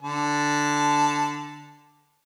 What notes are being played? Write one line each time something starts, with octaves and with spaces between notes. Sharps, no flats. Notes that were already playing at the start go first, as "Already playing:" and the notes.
D3 A5